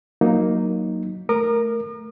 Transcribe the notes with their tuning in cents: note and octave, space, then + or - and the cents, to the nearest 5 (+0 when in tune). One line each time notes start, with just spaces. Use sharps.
F#3 +0 A#3 +0 D#4 +0
A3 +0 A#4 +0 D#6 -45